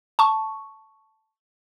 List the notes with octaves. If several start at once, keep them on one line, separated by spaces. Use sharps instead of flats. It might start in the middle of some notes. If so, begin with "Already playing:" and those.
A5 C#6